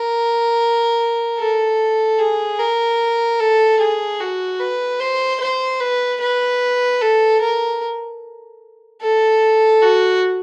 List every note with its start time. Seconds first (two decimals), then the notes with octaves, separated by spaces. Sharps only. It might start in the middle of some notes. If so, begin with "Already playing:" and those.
Already playing: A#4
1.38 A4
2.19 G#4
2.59 A#4
3.40 A4
3.80 G#4
4.20 F#4
4.60 B4
5.00 C5
5.40 C5
5.80 B4
6.21 B4
7.01 A4
7.41 A#4
9.02 A4
9.82 F#4